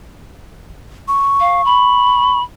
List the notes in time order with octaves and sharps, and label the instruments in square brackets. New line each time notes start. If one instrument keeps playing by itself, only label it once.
[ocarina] C#6
[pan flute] F5
B5